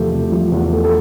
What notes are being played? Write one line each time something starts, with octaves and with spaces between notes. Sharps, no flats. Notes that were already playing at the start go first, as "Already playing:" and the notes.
Already playing: E2 C3 F3 A3 G4 A4
C3
F3
E2
A3
A4